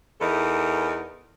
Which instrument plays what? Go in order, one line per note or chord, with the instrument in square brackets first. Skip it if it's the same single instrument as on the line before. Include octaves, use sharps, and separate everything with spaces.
[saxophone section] E2 E3 D#4 A4 A#4